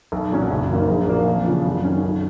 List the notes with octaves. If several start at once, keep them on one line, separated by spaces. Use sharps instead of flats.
B1
A#2 F#3 C#4
F#1
F#2 D#3 A#3
A#1
A#2 F#3 A#3 D#4
F2
C#3 F3
F#2
D#3 F#3 C#4
B1